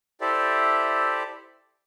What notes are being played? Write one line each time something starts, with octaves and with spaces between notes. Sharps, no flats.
E4 G4 A4 C5 D5 E5